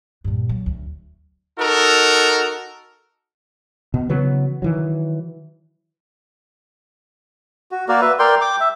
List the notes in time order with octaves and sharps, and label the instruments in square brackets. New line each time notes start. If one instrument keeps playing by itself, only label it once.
[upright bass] G2 A#2
F#3
D2
[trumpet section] D#4 F#4 A4 A#4
[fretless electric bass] B2
C#3 E3 F#3 B3
D#3 E3 F#3
[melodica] F#4
A#3 F#4 A#4 D5
B4 E5
A#4 D5 G5 C6
G5 D6
E5